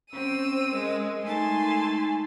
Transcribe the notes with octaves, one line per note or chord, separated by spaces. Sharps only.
C4 C#4 E6 D#7
G#3 A#4
G#3 A3 D#4 G#5 A5 C6